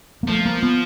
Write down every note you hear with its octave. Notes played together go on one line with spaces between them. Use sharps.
A#3
F3 A3
A#3
B3